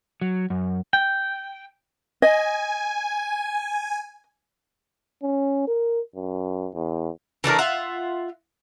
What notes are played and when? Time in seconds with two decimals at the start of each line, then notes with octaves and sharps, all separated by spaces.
0.21 F#3
0.50 F#2
0.93 G5
2.22 D#5 G#5
5.23 C#4
5.67 A#4
6.15 F#2
6.75 E2
7.44 E3 A3 D4 A#4
7.59 F4 E5 F#5